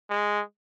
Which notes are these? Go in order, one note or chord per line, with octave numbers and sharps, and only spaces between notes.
G#3